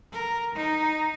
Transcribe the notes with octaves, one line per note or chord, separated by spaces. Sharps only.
A#4
D#4